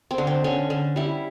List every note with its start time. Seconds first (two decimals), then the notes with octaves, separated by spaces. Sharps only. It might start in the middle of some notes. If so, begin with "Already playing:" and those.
0.11 C4
0.18 D3
0.27 C4
0.44 D3 C#4
0.70 D3
0.96 G3 E4